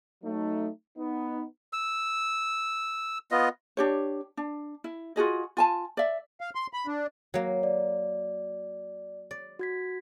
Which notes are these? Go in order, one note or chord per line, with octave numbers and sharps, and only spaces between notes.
F#3 A3 D#4
B3 D#4
E6
B3 F4 D#5
D4 G4 C#5
D4
E4
F4 F#4 G#4 D#5
F4 G#5 A5
D5 E5
F5
C6
B5
D4
F#3 A#3
D5
D5
F#4 G#6 B6